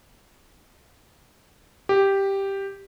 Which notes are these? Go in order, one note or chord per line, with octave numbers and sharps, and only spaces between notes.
G4